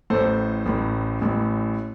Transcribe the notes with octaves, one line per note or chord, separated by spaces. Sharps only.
A1 A2 A4 C5
A1 A2
A1 A2